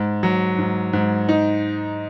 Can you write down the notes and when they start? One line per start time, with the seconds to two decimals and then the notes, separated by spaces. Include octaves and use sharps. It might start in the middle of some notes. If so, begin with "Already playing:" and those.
Already playing: G#2
0.23 F#3
0.58 G#2
0.93 G#2
1.29 D#4